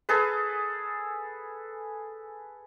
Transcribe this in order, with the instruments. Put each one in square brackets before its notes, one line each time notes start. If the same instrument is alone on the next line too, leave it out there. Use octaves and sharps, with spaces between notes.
[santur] G#4 A4 B4